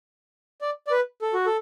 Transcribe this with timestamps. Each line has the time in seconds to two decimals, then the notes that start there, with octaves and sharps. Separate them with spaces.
0.61 D5
0.87 D5
0.91 B4
1.22 A4
1.34 F#4
1.46 A4